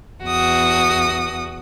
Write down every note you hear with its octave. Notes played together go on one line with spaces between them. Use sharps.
E2 F#4 D#6